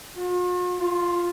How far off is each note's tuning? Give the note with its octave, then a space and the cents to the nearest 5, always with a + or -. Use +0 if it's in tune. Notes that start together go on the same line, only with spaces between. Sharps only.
F4 +45
F4 +0